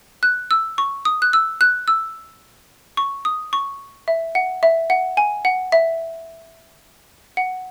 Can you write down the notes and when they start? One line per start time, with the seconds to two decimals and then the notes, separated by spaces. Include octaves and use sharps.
0.23 F#6
0.51 E6
0.78 C#6
1.05 D#6
1.22 F#6
1.33 E6
1.61 F#6
1.88 E6
2.97 C#6
3.25 D#6
3.53 C#6
4.08 E5
4.35 F#5
4.63 E5
4.90 F#5
5.17 G#5
5.45 F#5
5.72 E5
7.37 F#5